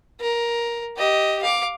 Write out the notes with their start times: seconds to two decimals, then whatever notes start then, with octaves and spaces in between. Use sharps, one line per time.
0.20 A#4
0.97 G4 D#5
1.42 F5 D6